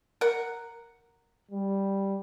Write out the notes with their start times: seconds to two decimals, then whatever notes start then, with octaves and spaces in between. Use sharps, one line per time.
0.21 A#4 F#5
1.51 G3